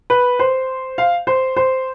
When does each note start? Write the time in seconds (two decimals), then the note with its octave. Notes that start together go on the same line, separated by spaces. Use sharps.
0.10 B4
0.39 C5
0.98 F5
1.27 C5
1.56 C5